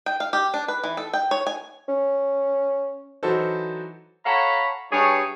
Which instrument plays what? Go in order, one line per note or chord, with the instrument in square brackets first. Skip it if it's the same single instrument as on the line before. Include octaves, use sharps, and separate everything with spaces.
[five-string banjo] G5
F5
G4
D4
B4
E3
A4
G5
C#5
G#5
[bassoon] C#4
[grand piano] E3 F#3 D#4 F#4 A4 C5
[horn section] A4 C#5 F5 F#5 A#5 B5
G2 G#4 C#5